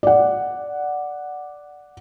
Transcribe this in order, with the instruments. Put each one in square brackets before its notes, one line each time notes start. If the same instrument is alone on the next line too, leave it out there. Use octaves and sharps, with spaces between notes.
[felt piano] D5 F#5